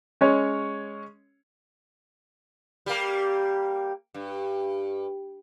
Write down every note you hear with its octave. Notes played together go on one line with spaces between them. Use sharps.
G#3 C#4 C#5
G3 A#3
G2